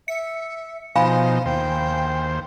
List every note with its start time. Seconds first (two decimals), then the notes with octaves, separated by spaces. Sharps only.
0.08 E5 C#7
0.96 B2 F3 D#4 C5 F5 G#5 B5
1.46 D#2 C5 G5